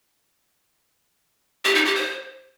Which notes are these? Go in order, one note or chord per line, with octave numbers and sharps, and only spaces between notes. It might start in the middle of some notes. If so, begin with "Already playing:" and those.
G4
D#4
G4
C5